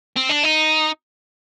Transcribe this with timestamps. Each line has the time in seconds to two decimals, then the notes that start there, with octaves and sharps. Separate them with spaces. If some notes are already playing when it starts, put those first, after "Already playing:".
0.16 C4
0.29 D4
0.43 D#4